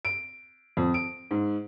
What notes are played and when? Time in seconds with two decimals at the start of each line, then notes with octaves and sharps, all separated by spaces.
0.05 D7
0.77 F2
0.94 D7
1.31 G#2